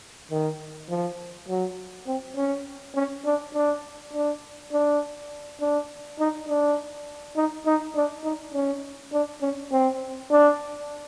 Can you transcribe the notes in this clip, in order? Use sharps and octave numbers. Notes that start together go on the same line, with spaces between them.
D#3
F3
F#3
C4
C#4
C#4
D4
D4
D4
D4
D4
D#4
D4
D#4
D#4
D4
D#4
C#4
D4
C#4
C4
D4